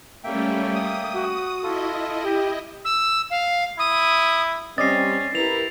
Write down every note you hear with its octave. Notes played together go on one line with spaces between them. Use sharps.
G3 A3 A#3 C#4 E5 G5
D#6
F#4
E4 F4 A4 D#5
G4
E6
F5
E4 D#6
G3 C4 C#4 D5 D#5 A6 A#6 C7
E4 G4 A#4 B4 F7